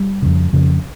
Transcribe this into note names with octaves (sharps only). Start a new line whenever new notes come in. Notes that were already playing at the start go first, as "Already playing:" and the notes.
Already playing: G3
F2 C#3
F2 C#3